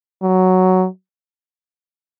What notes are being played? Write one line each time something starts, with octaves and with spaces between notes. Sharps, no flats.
F#3